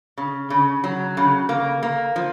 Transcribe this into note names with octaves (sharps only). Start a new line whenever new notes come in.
C#3
C#3
F#3
C#3
A#3
A#3
F3